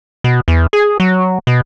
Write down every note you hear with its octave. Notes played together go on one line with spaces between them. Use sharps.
B2
E2
G#4
F#3
B2